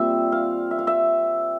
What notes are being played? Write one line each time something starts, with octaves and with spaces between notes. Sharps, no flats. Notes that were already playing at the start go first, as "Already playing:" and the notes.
Already playing: A#2 G3 C4 E5
F5
E5
F5
E5